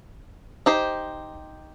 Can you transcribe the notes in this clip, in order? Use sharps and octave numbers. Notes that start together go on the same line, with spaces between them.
D#4 G4 C5